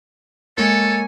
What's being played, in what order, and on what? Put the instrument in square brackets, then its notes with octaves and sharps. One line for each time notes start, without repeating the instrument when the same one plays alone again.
[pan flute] G#3 [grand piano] A#3 [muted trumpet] A4 [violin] C#5 G#5